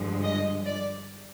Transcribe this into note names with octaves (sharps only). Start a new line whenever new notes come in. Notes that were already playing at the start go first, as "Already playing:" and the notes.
Already playing: G2 D3 F3 G#3
D#5
D5